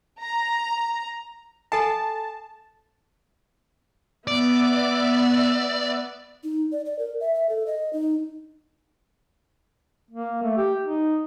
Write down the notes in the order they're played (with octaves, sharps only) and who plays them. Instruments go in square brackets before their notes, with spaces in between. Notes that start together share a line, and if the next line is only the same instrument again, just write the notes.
[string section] A#5
[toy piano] A4 F#5 G#5 [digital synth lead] A5
[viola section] B3 E5 [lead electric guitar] D5
[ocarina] D#4
D5
D5
A#4
E5
E5
A4
D#5
D#4
[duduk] A#3
A3
G4
D#4